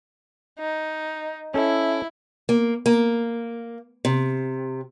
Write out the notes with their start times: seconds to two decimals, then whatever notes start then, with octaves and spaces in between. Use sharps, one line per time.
0.59 D#4
1.54 C#4 E4 A4
2.49 A#3
2.86 A#3
4.05 C3